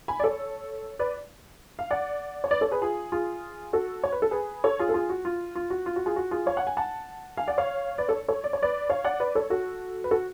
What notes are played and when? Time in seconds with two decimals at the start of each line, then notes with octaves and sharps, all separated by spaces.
0.08 G#5 B5
0.20 D5
0.24 A4 C#5
0.99 B4 D5
1.79 F5
1.91 D5 F#5
2.44 C#5
2.51 B4 D5
2.61 A4 C#5
2.71 G#4 B4
2.82 F4 G#4
3.12 F4 G#4
3.73 F#4 A4
4.04 C#5
4.12 B4
4.22 A4
4.31 G#4 B4
4.64 A4 C#5
4.79 F4 G#4
4.89 A4
4.94 F4 G#4
5.10 F#4
5.25 F4
5.56 F4
5.70 F#4
5.86 F4
5.96 F#4
6.06 F4 G#4
6.16 F#4
6.31 F4 G#4
6.46 C#5 F5
6.57 F#5
6.67 G#5
6.77 F#5 A5
7.37 F5 G#5
7.47 D5 F#5
7.58 C#5 F5
7.98 B4 D5
8.08 A4 C#5
8.28 A4 C#5
8.44 D5
8.53 C#5
8.62 B4 D5
8.90 C#5 F5
9.05 D5 F#5
9.20 B4 D5
9.35 A4 C#5
9.50 F#4 A4
10.04 B4
10.11 F#4 A4